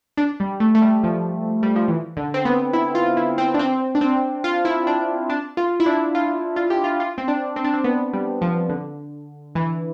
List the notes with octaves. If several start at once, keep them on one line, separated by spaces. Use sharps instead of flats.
D4
G3
A3
A3
G3
F3
G3
F3
E3
D3
C4
B3
E4
F4
E4
C4
D4
C4
D4
C4
F4
E4
D4
D4
F4
E4
D4
F4
F4
G4
F4
F4
C4
D4
C4
D4
C4
B3
G3
F3
D3
E3